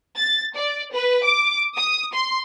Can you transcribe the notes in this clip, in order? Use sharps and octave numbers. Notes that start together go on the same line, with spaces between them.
A6
D5
B4
D6
D#6
C6